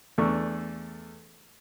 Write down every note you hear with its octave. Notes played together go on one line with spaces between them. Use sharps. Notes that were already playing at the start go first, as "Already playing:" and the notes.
E2 A3 D4 C#6